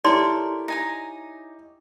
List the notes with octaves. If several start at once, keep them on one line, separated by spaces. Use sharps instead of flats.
E4 G4 A4 A#4 C#5 D5 C6
D#4 G#5 A#5